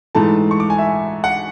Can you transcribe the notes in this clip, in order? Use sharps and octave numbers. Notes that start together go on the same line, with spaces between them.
G#2 E3 A3 A5
C#6
D6
G#5
E5
F#5